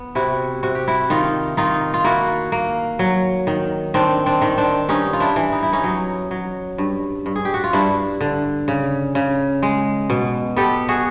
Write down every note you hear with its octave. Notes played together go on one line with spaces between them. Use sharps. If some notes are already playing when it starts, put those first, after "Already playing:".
Already playing: B3
C3 E4 F#4
C3 F#4
G4
E4 F#4
D#3 D#4 F4
D#3 D#4 F4
F4
A#3 E4 F#4
A#3
F#3
D#3
D#3 C4 D4
C4 D4
D#3
C4 D4
G2 C#4 D#4
F4
D4 E4
E3
D#4
E4
C#4 D#4
F#3
F#3
G2
G2
G#4
G4
F#4
F4
G2 D4 E4
D3
C#3
C#3
G#3
B2
B3 G4 A4
F#4 G#4